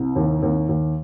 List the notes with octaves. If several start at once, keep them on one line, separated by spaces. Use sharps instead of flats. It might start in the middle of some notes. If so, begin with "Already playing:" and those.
Already playing: C2
D#2
D#2
D#2